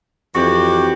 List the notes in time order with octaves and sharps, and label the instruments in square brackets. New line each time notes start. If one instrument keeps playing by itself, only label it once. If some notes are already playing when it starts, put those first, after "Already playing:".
[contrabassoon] F2 [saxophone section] E3 F#4 G4